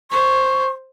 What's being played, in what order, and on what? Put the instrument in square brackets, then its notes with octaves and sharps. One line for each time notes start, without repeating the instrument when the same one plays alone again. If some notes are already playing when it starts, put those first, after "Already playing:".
[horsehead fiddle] C5 [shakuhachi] C#6